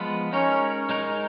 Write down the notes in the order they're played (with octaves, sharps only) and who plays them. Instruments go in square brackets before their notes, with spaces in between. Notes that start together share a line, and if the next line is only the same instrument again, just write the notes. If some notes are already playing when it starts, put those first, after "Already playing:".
Already playing: [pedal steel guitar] F3 G#3 B3 F4 B4
[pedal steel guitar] G#3 D#4 A#4 C#5 [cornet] C#4
[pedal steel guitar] G#3 D#4 A#4 C#5